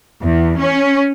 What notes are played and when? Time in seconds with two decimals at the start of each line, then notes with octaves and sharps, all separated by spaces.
0.23 E2
0.59 C#4